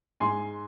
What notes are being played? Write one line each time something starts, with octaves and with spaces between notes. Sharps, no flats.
G#2 G#3 G#5 C6